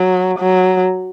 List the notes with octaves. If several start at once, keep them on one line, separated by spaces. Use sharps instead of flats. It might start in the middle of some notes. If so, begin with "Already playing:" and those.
Already playing: F#3
F#3